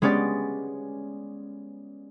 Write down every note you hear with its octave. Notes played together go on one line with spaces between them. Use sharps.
G#3 B3 C#4 G4 D5 A6